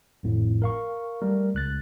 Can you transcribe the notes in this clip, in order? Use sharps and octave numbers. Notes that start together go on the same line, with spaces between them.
G#1 F2 A2
A#4 F5 C#6
G3 A3 A#4
C#2 F#6 A6